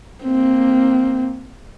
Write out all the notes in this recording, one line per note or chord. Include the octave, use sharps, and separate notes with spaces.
A#3 C4